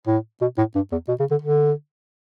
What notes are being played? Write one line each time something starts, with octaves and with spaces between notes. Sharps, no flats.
A2
B2
A2
G2
E2
B2
C#3
D3
D3